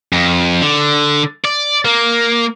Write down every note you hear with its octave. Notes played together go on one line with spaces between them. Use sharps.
F2
D3
D5
A#3